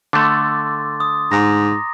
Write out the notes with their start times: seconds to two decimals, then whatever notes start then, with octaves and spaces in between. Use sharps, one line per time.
0.13 D3 A3 C6 D6 A6
1.00 D#6
1.31 G#2 A#5 A#6